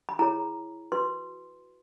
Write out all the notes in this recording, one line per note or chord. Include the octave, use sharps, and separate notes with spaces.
B5
E4 G#4 C#5 A#5
F#4 B4 C6